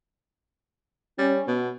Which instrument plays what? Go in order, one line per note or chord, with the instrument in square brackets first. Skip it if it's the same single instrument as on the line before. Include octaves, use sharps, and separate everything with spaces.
[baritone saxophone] G3 [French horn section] C#4
[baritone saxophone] B2 [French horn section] B3